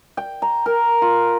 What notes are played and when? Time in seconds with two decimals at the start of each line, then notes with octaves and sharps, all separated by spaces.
0.17 G5
0.42 A#5
0.66 A#4
1.02 F4